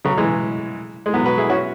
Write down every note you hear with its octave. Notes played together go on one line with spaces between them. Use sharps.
C#3 F#3
E3 G#3
G#3
F#3 B3
F#4 B4
E4 G#4
C#4 F#4